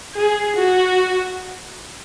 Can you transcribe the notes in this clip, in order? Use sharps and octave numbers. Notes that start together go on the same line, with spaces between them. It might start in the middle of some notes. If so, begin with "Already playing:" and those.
G#4
F#4